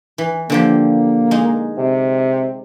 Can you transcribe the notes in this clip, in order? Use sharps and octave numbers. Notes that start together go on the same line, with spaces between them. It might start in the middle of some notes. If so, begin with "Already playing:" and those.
E3
D3 F3 A#3 G4
G#3 D#4
C3